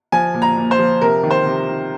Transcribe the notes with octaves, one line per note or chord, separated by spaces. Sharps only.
F3 G#5
A#2
A#5
A#2
C5
F3
C3 A#4
D#3
C5
C3
D#3